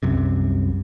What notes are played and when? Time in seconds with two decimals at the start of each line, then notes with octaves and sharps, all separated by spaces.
0.03 C2 F#2 C3